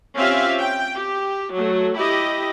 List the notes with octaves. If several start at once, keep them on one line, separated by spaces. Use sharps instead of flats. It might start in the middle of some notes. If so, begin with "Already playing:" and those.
C4 C#4 F4 G4 E5 F5
G5
G4
F#3 A3
E4 G4 D#5